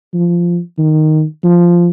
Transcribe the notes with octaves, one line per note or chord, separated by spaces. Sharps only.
F3
D#3
F3